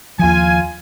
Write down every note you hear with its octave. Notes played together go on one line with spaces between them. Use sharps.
D#2 F3 F4 G#5